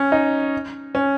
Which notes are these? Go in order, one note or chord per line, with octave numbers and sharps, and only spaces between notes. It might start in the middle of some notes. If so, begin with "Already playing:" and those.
Already playing: C#4
D#4
C#4